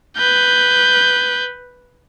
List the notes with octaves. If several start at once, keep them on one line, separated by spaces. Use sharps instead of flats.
B4 G6